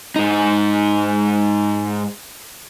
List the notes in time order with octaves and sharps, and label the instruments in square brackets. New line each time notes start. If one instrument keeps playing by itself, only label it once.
[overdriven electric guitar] G#2 D#4